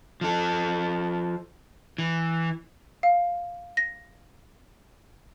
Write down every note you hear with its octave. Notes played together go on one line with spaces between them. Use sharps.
F3 A4
E3
F5
A#6